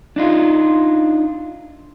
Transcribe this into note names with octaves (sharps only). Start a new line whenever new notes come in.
D4 D#4 F4